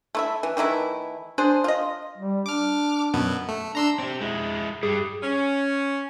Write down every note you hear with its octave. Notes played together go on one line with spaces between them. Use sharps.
A3 E4 E5
E3
D#3 E3 A3 E4
D4 G#4 C5
F4 D#5
G3
D4 D6 F6
F#2 B2 B3
A3
D4 A#5 C6 E6
C4 G4
G#3 E4
G2 G3 G#4
C#4